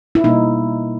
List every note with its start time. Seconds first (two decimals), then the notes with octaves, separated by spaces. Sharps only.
0.15 E4
0.24 B2 G3 A#3 D#4